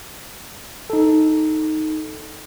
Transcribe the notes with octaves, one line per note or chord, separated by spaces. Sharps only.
D#4 A4